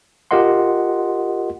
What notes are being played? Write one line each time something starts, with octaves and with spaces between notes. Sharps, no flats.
F4 G4 A#4 D#5 F#5 C6